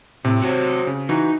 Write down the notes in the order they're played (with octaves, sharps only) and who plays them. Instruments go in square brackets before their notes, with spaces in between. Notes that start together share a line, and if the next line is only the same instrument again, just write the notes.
[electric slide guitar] A2 [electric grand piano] C3 C4
[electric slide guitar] F#4 C5 C#5
[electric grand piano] C#3
[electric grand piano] E3 F#4 [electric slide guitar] D#4